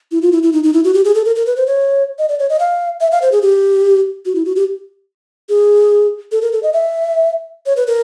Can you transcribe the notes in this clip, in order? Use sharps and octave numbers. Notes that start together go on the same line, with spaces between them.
E4
F4
E4
E4
D#4
D#4
E4
F#4
G4
G#4
A4
A#4
A#4
B4
C5
C#5
D#5
D5
C#5
D#5
F5
E5
F5
C5
G#4
G4
F#4
E4
F#4
G4
G#4
A4
A#4
A4
D#5
E5
C#5
B4
A#4